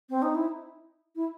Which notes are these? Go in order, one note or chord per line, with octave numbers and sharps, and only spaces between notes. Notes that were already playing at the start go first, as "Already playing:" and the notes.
C4
D#4
E4
E4